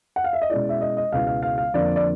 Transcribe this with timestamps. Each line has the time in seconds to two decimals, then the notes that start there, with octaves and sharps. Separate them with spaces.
0.16 F#5
0.24 F5
0.33 E5
0.42 D#5
0.50 B2 G#3 C#4 E4 D5
0.69 E5
0.81 D#5
0.97 D#5
1.12 C#2 B2 G#3 B3 E4 F5
1.27 F5
1.43 F5
1.58 F5
1.74 F2 D3 F3 A#3 D5
1.96 D5